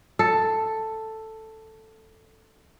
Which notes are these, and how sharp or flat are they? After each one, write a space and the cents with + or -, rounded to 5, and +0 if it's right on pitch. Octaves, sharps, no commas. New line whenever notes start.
A4 +5